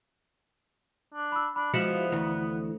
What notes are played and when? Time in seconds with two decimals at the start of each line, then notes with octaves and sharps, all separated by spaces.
1.14 D4
1.32 B5 E6
1.56 D4 B5
1.74 F3 G#3 B3 E4 F#4 C#7 E7 F#7
2.12 D2 E3 E4